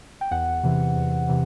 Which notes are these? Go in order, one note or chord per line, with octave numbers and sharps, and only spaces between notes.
G5
E2 F#5
C3 E3
E2
C3 E3